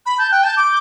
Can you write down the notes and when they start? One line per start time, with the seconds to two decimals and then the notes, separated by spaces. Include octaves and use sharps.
0.05 B5
0.18 A5 G6
0.31 G5 F#6
0.43 A5 G6
0.56 D6 G6